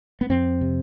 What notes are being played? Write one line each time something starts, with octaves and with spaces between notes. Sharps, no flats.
B3
F2 C4
C3